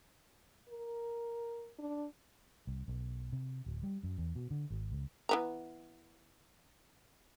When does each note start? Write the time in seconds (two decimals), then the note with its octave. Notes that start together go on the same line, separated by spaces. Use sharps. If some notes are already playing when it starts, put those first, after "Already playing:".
0.69 A#4
1.79 D4
2.67 C2
2.88 B1
3.32 C3
3.66 D1
3.83 G3
4.03 F#2
4.18 E2
4.36 B2
4.51 D3
4.70 G#1
4.92 C#2
5.29 E3 B3 A#5